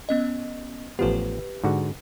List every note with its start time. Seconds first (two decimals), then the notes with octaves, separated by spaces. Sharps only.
0.09 B3 C#4 D#5
0.99 A1 F3 B3 G4 B4
1.64 G#2 D3 F#4